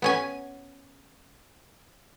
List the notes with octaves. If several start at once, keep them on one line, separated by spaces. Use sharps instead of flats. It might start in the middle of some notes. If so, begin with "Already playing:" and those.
B3 C#4 G#5